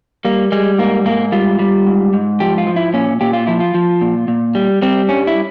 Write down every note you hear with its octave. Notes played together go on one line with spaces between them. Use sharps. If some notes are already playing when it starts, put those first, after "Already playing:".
G3 A#3
G3 G#3
G#2 A#3
G#2 A#3
G3 F4
G3
G#2
G#2
F3 G4
F4
F3
E4
A#2 C#4
A#2 G4
F4
F3 E4
F4
F3
A#2
A#2
G3
G3 C4
G2 C#4
E4